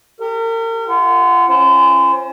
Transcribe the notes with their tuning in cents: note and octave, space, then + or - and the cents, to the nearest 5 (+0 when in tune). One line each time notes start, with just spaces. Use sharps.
G4 +15 A#4 -35
F4 -30 F#5 +0
C#4 -25 F4 -40 C5 +0